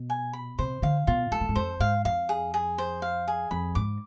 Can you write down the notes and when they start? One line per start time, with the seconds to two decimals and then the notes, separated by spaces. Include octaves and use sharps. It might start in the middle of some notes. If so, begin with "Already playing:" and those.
Already playing: B2
0.10 G#5
0.33 B5
0.59 C3 C5
0.82 D3 F5
1.07 B2 F4
1.31 G#2 A4
1.40 A2
1.49 G#2
1.55 F2 C5
1.80 G#2 F5
2.05 F2 F5
2.29 G#4
2.54 G#4
2.78 C5
3.02 F5
3.28 G#4
3.51 F2 B5
3.75 G#2 D6